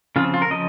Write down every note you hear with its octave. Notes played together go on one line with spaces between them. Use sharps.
C#3 F3 C4 F4
F4
A#4
C#3 F3 D#5